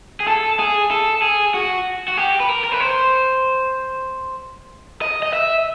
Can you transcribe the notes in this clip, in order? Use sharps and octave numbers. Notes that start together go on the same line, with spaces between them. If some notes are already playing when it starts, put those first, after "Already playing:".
G#4
A4
G#4
A4
G#4
F#4
F#4
G4
B4
A#4
A#4
B4
C5
D#5
D#5
E5